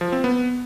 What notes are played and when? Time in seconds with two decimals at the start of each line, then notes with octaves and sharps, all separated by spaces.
0.01 F3
0.12 C4
0.24 B3